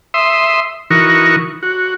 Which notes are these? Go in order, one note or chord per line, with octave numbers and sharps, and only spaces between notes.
E5 C6 D#6
E3 D#4 F#4 A#4 C#6
F#4